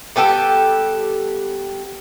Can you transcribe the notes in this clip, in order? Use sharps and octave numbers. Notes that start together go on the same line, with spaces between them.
G3 B3 G4 A4